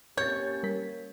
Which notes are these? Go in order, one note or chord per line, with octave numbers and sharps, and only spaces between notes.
A#3 C#4 G4 C#5 G6 A6
G3 A#4 B6